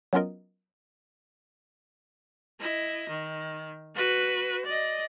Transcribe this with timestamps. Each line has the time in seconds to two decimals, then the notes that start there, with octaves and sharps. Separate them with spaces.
0.13 F#3 B3 C#4 F4 A#4 D#5
2.60 E4 D#5
3.09 D#3
3.95 F#4 B4
4.65 D5 D#5